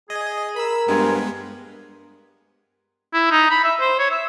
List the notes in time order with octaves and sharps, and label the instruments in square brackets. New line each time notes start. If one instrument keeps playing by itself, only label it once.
[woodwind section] G#4 [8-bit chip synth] D#5
[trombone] A#4 [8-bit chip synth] B5 E6
[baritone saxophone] G2 [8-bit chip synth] G#3 B3 [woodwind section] F4 C5 G#5
[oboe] E4
D#4
B5
E5
C5
C#5
E5